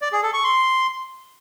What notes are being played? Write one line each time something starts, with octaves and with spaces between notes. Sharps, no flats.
D5
G#4
A4
C#6
C6